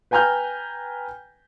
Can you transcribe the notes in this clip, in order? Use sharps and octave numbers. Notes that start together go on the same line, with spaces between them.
B4 G5 G#5 A#5 F6 G6